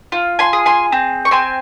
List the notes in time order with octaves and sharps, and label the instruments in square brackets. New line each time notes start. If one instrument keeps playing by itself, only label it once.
[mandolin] F4
G#5 C6
G#4
G#5 C6
C4
C#6
C4 G#5 C6